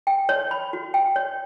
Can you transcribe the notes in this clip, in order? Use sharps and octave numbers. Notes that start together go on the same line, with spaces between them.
G5
C#5
B5
F#4
G5
C#5